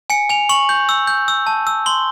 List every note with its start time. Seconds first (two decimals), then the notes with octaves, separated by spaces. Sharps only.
0.10 G#5 C#7
0.30 G#5 F7
0.49 C#6 F#7
0.69 G6
0.89 E6
1.07 G6
1.28 E6
1.47 A5
1.67 E6
1.86 C6 G7